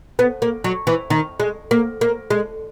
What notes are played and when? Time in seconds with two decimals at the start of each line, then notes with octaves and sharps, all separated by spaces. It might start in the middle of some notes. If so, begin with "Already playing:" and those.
0.19 B3
0.42 A#3
0.64 F#3
0.87 E3
1.10 D#3
1.40 G#3
1.71 A#3
2.01 A#3
2.30 G#3